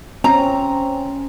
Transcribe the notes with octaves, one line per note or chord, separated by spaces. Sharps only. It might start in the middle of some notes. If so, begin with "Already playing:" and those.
C4 C#4 A#5